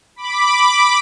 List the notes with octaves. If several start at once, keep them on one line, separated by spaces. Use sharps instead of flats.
B5 D6